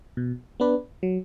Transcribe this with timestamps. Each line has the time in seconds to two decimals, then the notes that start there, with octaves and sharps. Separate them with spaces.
0.17 B2
0.60 B3 D4 B4 D5
1.03 F#3